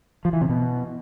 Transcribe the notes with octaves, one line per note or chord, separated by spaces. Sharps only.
F3
E3
C3
B2